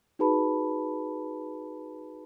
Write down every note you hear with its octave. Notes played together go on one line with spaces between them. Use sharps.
D#4 F#4 G#4 B4 A5 B5